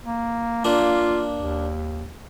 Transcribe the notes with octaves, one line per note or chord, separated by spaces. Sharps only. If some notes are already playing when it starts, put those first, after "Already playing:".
A#3
A#3 D4 F4
D#2